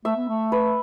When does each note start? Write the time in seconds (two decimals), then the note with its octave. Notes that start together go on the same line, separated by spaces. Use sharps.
0.05 A3 E5
0.16 B3
0.29 A3
0.52 B4